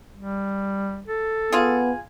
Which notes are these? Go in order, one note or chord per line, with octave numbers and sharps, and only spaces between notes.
G3
A4
B3 F4 G#4